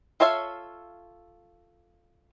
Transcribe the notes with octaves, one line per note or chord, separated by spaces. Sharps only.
F4 A4 C#5 E5 F5